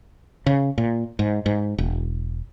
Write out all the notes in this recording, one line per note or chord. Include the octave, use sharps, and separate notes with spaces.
C#3
A#2
G#2
G#2
E1